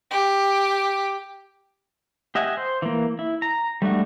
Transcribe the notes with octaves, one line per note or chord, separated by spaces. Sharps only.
G4
G4 D#5 E5 F#5 G#5
C5
E3 A#3
E4
A#5
G3 A3 D4 F#4